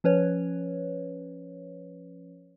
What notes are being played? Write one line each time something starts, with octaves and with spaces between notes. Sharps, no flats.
F3 C#4 B4 C#5